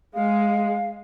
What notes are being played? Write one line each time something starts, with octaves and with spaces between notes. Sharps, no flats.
G#3 F5